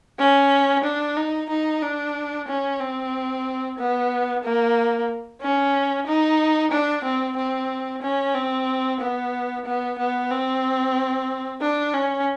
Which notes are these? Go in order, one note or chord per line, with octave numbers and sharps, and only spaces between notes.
C#4
D4
D#4
D#4
D4
C#4
C4
B3
A#3
C#4
D#4
D4
C4
C4
C#4
C4
B3
B3
B3
C4
D4
C#4